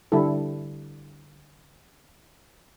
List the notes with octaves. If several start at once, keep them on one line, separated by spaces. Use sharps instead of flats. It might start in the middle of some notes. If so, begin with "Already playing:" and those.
D3 G3 D4 E4 A4